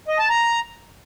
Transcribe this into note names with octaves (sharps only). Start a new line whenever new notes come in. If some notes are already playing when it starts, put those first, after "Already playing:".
D#5
A5
A#5